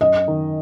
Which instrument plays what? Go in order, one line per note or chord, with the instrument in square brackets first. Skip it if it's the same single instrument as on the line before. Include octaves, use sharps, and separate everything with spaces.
[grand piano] F#2 [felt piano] D#5
[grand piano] D#3